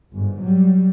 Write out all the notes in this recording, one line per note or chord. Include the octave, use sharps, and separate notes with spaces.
G1 G#2
F#3 G3